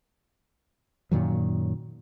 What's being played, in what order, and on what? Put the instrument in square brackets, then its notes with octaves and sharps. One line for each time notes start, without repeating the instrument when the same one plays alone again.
[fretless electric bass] F#2 A#2 D#3 F#3